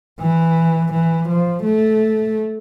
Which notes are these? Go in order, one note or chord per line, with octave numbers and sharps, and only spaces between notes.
E3
E3
F3
A3